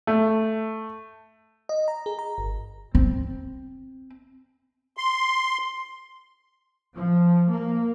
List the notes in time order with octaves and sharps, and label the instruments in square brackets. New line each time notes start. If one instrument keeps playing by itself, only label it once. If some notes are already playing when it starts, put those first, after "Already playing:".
[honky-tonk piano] A3
[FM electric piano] D#5
A#5
G#4
A#5
G1
[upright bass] C4
[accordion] C6
[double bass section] F3
A#3